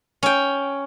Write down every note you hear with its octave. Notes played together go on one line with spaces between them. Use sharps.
C#4 G5